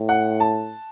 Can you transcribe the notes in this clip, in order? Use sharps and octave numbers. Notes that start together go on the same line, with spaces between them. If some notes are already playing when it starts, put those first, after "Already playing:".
Already playing: A2
F#5
A5